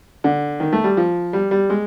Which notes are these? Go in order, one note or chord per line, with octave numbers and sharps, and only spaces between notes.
D3
D#3
A3
G3
F3
G3
G3
G#3